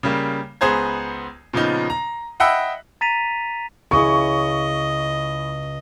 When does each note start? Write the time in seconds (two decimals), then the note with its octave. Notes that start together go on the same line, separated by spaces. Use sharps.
0.03 C#3 G3 A#3
0.61 C#2 B3 G#4 C5 A#5 G#6
1.53 A#2 C#3 F3 B3 D#4
1.90 A#5
2.40 D#5 E5 F#5 G5 B5 E6
3.01 A#5 A6 B6 D#7 F7
3.91 C#2 E4 G#4 D#5 C#6 D#6